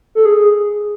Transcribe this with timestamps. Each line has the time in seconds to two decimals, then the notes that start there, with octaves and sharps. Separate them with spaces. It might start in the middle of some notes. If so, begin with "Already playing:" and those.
0.15 A4
0.25 G#4